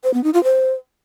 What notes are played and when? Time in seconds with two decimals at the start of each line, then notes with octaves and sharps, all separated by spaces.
0.04 C5
0.14 B3
0.24 D#4
0.34 F4
0.44 C5